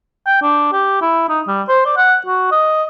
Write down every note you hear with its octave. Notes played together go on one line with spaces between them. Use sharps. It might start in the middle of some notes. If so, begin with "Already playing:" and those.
G5
D4
G4
E4
D#4
G3
C5
D5
F#5
F#4
D#5